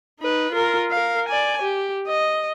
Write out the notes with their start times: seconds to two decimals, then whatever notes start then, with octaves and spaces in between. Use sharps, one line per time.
0.20 D#4 B4
0.52 F4 A#4
0.91 A#4 F5
1.28 D5 G#5
1.62 G4
2.07 D#5